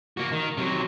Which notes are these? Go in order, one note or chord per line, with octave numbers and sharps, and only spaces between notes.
A#3 F#4
D#3
C3 F#3